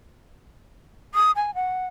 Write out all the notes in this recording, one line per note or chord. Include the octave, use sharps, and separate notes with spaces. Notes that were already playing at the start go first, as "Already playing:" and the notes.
D#6
G#5
F#5